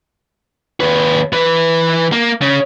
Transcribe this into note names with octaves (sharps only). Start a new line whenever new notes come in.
D#2 B4
E3 B4
A#3
C#3